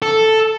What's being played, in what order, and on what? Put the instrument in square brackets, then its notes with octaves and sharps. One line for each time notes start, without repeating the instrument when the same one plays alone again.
[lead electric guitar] A4